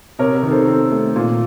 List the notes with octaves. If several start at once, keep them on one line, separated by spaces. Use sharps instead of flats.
C3 A#4 C#5
A#4
D#3
A4 C5
C4 A4
A3
A#2